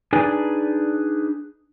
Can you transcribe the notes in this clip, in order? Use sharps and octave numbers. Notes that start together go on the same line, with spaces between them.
D4 D#4 G#4 B4 D5 G#5